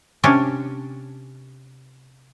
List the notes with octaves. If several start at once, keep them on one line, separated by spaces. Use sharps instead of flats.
C3 C#4 D4 F5